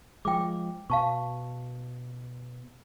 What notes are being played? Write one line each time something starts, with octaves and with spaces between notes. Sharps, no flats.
F3 G#3 G5 D6
B2 F5 A5 C#6